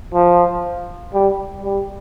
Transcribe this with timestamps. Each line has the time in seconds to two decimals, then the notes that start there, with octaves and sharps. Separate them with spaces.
0.14 F3
1.14 G3
1.63 G3